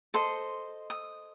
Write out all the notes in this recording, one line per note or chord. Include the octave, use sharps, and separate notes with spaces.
A4 C5 D#5 C6
D#6